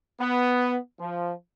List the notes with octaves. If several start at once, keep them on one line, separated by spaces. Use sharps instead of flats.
B3
F3